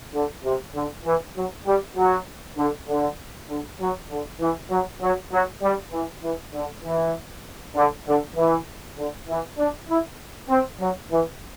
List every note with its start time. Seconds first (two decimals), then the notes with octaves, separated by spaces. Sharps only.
0.14 D3
0.44 C3
0.75 D3
1.05 E3
1.35 F#3
1.66 G3
1.96 F#3
2.57 D3
2.88 D3
3.49 D3
3.80 F#3
4.10 D3
4.40 E3
4.70 F#3
5.02 F#3
5.32 F#3
5.62 G3
5.92 E3
6.23 E3
6.54 D3
6.84 E3
7.76 D3
8.06 D3
8.36 E3
8.98 D3
9.28 E3
9.58 D4
9.89 E4
10.49 C4
10.79 F#3
11.11 E3